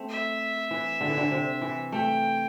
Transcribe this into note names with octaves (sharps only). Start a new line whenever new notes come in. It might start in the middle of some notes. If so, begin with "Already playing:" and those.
Already playing: A3 C4
E5
E3
D3
E3
D3
C3
E3
A3 G5